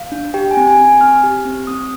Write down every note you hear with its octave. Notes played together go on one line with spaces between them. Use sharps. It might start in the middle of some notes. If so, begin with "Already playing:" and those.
Already playing: F5
D4
G4 G5
G#5
C4
G#5
C4
G#5
C4 F6
G4
C4
C4 D#6